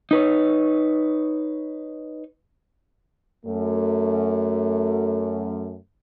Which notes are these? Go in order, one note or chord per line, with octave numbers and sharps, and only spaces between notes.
D#4 B4 C#5
F#2 A3